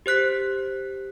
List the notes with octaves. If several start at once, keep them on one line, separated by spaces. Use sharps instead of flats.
G4 C5 F#6 B6